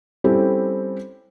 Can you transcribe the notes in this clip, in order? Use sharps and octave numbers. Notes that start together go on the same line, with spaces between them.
G3 C4 C#4 E4 G4 A4